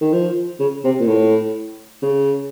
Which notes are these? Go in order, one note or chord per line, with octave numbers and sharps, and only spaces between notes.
D#3
F3
C#3
C3
A#2
A2
C#3